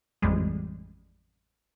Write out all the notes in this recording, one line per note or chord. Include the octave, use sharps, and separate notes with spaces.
A1 F2 G3 G#3